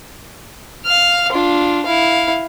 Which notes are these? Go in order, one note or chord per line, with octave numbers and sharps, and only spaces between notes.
F5 F6
D4 F4
E4 F5